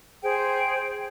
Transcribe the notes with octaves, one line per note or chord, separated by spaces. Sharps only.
G#4 C5 G5